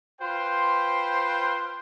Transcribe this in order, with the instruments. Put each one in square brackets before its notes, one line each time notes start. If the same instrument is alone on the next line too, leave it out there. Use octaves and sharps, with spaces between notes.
[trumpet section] F4 B4 C5 G5 C6